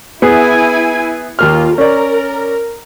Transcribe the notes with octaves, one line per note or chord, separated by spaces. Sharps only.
B3 E4 G#4 G#5
D#2 A#3 F4 F6
C#4 A#4 D5